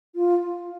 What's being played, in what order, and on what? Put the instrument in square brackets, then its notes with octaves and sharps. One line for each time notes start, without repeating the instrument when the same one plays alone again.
[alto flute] F4